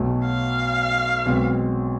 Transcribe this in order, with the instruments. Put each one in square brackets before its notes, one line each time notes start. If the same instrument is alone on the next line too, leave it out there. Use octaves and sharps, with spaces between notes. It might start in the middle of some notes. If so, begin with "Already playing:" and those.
Already playing: [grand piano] B1 B2 F#3 A3
[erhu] F5
[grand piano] B1 B2 G#3 C4